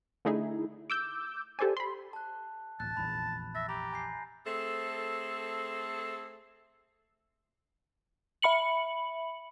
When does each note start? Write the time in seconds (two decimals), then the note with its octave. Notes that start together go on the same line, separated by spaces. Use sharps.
0.25 D3 A3 D#4 E4 G#4
0.90 D6 E6 G6
1.59 G4 A4 C5 D5 G#5
1.77 B5 C6
2.13 A5 F#6
2.80 D1 A1 A5 F#6
2.97 F1 A#1 E2 B5
3.55 E5 A6 A#6
3.69 G4 A#5 B5
3.93 G#5 G6 C7
4.46 A3 C4 G#4 A4
8.42 E5 B5 C#7 F#7